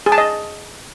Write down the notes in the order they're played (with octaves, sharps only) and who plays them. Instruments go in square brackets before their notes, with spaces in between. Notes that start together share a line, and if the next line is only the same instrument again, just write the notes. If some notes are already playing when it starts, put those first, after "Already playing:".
[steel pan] G#4
A5
D#5